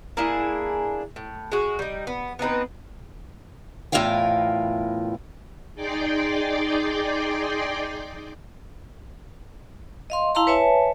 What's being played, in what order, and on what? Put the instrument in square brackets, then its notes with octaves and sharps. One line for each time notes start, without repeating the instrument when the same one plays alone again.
[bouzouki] A#3 D4 E4 G#4
A2
G#3 F#4
G3 D#4
B3
B3 C4 D#4 B4
[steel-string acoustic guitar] E2 A2 F4 A#4 F5 G5
[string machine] D#4 G#4 D5 G5 C6 D6
[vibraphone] D#5 F5 C6
E4 F5 A5 A#5 C6
B4 C#5 E5 G#5 A5